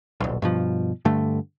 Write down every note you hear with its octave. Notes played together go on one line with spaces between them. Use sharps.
D#1 B1
G2 B2 F3
G2 D3 A3